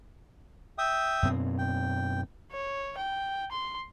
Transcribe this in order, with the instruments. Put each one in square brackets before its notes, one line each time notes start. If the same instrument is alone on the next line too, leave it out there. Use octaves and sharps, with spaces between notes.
[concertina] E5 G5 D#6
[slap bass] F#2 B2 C4
[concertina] G5
[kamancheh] C#5
G5
C6